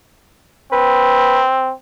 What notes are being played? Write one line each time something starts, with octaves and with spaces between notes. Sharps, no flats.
C4 B4